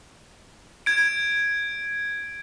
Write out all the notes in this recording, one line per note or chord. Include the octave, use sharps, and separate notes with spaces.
G#6 D7